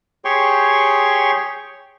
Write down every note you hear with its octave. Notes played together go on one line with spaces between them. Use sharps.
G4 G#4 C#5 G5 C6 C#6